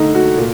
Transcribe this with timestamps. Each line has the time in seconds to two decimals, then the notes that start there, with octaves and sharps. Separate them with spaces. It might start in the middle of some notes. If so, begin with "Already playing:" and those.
Already playing: D3 A3 D#4
0.15 F#4
0.38 A#2